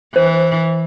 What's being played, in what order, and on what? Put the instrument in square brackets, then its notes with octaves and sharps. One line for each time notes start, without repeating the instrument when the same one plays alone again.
[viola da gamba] E3 [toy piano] C5